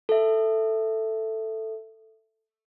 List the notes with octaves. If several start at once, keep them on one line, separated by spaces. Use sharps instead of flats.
A4 E5